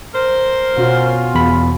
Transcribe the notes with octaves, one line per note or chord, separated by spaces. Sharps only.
A#4 C5
B2 C#4 F4 F#4
E2 B5